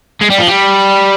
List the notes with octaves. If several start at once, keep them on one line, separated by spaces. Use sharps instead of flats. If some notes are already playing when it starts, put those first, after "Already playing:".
G#3
G3
F3
G3